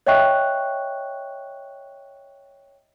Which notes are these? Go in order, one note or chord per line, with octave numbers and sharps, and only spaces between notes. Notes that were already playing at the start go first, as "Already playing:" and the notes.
C#5 D#5 E5 G5 C#6 F#6